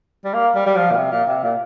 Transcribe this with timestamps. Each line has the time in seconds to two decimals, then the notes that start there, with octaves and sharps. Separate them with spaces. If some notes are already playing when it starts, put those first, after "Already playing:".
0.24 G3
0.33 A#3
0.55 G3
0.66 G3
0.76 F3
0.91 A#2
0.96 C3
1.12 A#2
1.28 C3
1.43 A#2